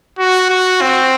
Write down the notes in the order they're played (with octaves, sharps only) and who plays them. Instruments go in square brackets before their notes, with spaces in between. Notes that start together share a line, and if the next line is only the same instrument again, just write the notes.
[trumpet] F#4
F#4
C4